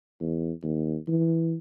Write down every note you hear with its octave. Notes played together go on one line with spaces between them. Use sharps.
E2
D#2
E3